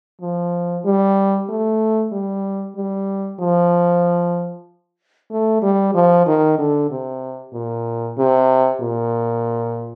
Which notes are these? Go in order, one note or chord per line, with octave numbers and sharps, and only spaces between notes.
F3
G3
A3
G3
G3
F3
A3
G3
F3
D#3
D3
C3
A#2
C3
A#2